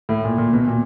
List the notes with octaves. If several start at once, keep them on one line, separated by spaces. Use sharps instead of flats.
A2
A#2
A#2
B2
A#2